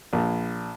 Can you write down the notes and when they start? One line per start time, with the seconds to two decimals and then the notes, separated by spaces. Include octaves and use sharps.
0.13 A#1